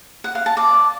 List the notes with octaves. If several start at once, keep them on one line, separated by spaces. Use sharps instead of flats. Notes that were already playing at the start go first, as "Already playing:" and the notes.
F#5
F5
A5
D5